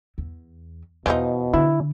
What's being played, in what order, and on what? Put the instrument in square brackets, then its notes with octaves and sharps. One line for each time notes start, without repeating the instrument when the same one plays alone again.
[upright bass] E2
[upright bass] E2 [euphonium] B2 [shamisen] E3 F3 D#4
[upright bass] D3 [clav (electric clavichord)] E4